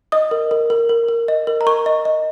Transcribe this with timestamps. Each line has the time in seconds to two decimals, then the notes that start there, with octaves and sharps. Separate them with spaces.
0.12 D#5 D#6
0.31 A#4
0.51 A#4
0.70 A#4
0.89 A#4
1.08 A#4
1.28 D#5
1.47 A#4
1.61 A#5
1.67 A#4 C#6
1.86 D#5
2.05 D#5